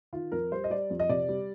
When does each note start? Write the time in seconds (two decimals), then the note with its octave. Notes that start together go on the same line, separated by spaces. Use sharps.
0.13 D#3 F4
0.32 F2 A#4
0.52 G3 C5
0.64 D#5
0.70 G3 D5
0.90 F2
1.00 D#5
1.09 C3 D5
1.29 G3